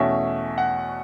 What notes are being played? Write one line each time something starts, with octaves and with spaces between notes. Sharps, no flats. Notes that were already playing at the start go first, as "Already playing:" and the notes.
Already playing: E2 B2 A3 C#4 E5
F#5